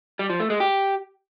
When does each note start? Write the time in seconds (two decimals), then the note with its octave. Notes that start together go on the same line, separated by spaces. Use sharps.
0.19 G3
0.30 F3
0.40 A3
0.50 G#3
0.60 G4